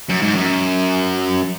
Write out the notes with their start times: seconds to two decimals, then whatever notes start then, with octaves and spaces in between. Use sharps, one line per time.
0.09 F#2
0.21 G#2
0.35 F#2